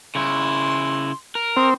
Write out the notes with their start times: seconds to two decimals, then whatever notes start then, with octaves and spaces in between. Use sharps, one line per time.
0.15 C#3 E4 C6
1.35 A#4
1.57 C4 D#6